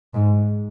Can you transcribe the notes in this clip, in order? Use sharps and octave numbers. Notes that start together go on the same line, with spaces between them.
G#2